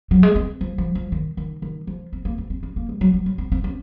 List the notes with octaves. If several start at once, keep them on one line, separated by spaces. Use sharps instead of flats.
F#3
G#3
C4
F3
F3
F3
D#3
D#3
D#3
F3
C4
A#3
C4
C4
C#4
A#3
G#3
F#3
F#3
F#3
C4
C4
C#4